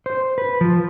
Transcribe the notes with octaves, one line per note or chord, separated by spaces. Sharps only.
C5
B4
F3